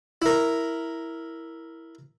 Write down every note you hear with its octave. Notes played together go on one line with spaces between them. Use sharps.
E4 A#4